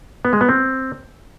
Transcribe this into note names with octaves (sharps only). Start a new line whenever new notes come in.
B3
G#3
B3
C4